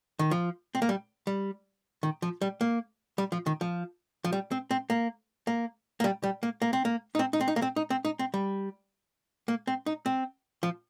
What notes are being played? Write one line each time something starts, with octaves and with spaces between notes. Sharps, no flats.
D#3
F3
C4
A#3
G3
G3
D#3
F3
G3
A#3
G3
F3
D#3
F3
F3
G3
C4
C4
A#3
A#3
A#3
G3
G3
A#3
A#3
C4
A#3
D#4
C4
D#4
C4
D#4
A#3
C4
D#4
C4
D#4
C4
G3
A#3
C4
D#4
C4
F3